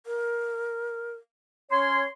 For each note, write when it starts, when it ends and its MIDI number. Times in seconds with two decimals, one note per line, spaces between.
0.06 1.13 70
1.71 2.02 61
1.71 2.04 73
1.71 2.04 84